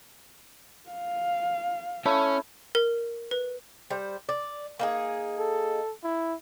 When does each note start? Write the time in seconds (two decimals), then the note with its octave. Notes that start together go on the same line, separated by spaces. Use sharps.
0.90 F5
2.06 A3 C#4 E4 C#5
2.75 A#4
3.31 B4
3.90 G3 C5
4.29 D5
4.79 A#3 D#4 G#4
5.39 A4
6.04 E4